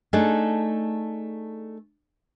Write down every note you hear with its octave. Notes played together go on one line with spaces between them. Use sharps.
A3 D4 D#4 G#4 A4